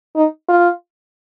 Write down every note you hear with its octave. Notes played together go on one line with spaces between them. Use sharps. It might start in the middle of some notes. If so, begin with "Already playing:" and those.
D#4
F4